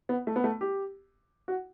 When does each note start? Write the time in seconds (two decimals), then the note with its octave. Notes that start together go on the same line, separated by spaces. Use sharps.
0.09 B3
0.27 A3
0.36 B3
0.44 A3
0.61 G4
1.48 F#4